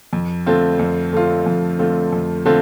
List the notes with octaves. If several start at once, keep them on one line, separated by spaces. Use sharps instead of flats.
F2
D3 A3 C4 F4
F2
D3 A3 C4 F4
F2
D3 A3 C4 F4
F2
D3 A3 C4 F4